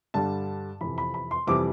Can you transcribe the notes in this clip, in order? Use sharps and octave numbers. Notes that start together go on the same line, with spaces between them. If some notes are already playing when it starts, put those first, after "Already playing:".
G2 D3 G3 A5
F2 C3 E3 B5
B5
B5
C6
F2 C3 E3 G3 D6